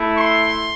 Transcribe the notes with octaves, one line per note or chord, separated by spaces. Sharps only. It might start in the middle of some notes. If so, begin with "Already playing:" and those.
Already playing: A3 E4
C6